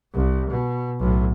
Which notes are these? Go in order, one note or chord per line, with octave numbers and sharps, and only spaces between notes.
C2
B2
B1 A2